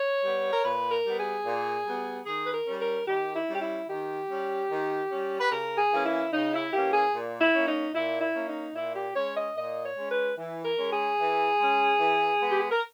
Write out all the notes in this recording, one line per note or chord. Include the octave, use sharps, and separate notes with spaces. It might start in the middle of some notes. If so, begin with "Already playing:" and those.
Already playing: C#5
G3 B3
A#4
A#2 B4
A#4
G3 B3
G#4
A#2
G3 B3
D#3 G#4
B4
A#4
G3 C#4
A#4
D#3 G4
E4
G3 C#4
G4
E4
D#3 G4
G3 C#4
D#3
G3 C#4
B4
C#3 A#4
G#4
E3 A#3 C#4
E4
C#3 D#4
E4
E3 A#3 C#4 G4
G#4
A#2
E4
A#3 C#4
D#4
A#2 E4
E4
A#3 C#4
D#4
A#2 E4
G4
G#3 C#4 C#5
D#5
A#2 D#5
C#5
G#3 C#4
B4
E3
A#4
G#3 C#4
G#4
E3
G#3 C#4
E3
G#3 B3
G4
G#4
A#4